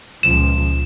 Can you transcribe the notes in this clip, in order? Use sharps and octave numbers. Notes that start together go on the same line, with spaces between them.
C#2 A#2 F3 E7